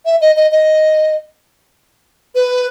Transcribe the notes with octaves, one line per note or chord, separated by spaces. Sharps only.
E5
D#5
D#5
D#5
B4